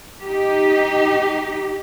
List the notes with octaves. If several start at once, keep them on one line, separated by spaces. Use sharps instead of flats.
D#4 G4